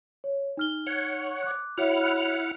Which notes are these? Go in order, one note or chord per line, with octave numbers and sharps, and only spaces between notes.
C#5
D#4 F6 G7
C#5 F#5
D6 F#6
E4 F#4 C#5 E5 F#5 F6